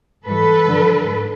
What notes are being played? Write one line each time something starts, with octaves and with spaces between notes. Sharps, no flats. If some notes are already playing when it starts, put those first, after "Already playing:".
G#2 E3 G3 A4 B4
G2 D3 F3
G#2